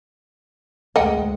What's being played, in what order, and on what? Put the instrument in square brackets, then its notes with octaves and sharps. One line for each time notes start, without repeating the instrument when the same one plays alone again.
[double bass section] D2 G#3 [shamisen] D#5 F#5 G5